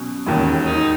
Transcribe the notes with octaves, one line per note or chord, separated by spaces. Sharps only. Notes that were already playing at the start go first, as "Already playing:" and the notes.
Already playing: B2 F#3 C#4
E1 D#2 D#3 C#4
D#4